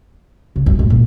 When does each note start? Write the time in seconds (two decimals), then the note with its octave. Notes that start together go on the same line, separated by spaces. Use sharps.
0.56 C#3
0.66 F#2
0.79 G#2
0.90 A#2